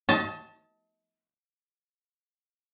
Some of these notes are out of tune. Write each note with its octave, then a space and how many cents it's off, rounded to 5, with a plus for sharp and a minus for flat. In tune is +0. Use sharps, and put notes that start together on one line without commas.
D#5 +40 A5 +0